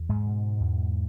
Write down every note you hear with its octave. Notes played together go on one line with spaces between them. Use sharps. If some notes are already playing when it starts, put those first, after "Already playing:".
Already playing: E2
G#2 G#3
B2
E2